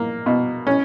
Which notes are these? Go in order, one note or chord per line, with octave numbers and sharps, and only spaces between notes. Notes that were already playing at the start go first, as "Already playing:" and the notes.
Already playing: A#3
B2
C#4